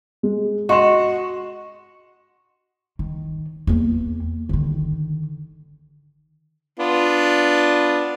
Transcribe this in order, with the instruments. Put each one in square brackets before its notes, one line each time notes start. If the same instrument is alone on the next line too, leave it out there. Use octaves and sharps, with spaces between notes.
[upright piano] G#3
[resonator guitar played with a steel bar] F#4 [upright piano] D#5 C6 E7
[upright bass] D#3
E2 A#3
D3 D#3
[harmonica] B3 D4 F4